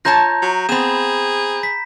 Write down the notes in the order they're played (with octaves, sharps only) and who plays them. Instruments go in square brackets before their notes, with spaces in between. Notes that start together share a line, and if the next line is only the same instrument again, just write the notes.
[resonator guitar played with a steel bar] F4 C#5 A5 [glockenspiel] A#5 G6 A#6
[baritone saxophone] F#3
[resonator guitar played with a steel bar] B3 C4 [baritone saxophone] G#4 [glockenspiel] B5 E7
[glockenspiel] B6